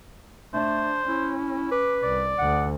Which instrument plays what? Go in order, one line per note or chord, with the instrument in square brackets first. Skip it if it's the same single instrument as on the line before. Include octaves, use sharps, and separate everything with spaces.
[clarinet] A3 [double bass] D4 [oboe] C5
[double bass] C#4 [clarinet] E4
[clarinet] B4 [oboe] D6
[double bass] C2 [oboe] D5
[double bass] D2 [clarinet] F#5